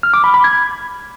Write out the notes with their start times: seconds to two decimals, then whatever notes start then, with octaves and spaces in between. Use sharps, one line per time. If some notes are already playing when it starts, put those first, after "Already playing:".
0.03 F6
0.14 D6
0.24 B5
0.34 B5
0.44 G#6